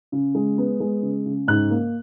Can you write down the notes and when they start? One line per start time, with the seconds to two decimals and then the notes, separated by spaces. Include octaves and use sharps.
0.12 C#3
0.35 G#3
0.58 B3
0.80 G#3
1.02 C#3
1.25 C#3
1.48 G#2 F#6
1.70 A#3